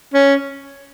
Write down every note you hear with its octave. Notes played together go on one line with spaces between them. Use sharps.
C#4